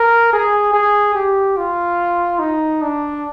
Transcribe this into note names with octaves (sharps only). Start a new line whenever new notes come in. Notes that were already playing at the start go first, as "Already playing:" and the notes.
Already playing: A#4
G#4
G#4
G4
F4
D#4
D4